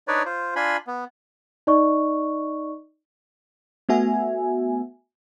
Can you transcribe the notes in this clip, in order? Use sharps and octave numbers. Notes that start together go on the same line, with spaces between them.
D4 D#4 B4 C#5 D5
F4 C5
D4 F4 G#5 B5 C6
B3
D#4 D5 D#5 C#6
A3 B3 F#4 E5 G#5